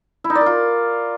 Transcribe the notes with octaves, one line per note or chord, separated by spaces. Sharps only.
E4
D#4
D5
A#4
F4